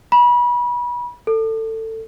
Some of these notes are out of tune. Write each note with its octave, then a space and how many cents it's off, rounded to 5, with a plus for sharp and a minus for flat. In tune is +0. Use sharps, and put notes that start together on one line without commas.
B5 -30
A4 +20